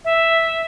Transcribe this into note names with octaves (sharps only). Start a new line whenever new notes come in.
E5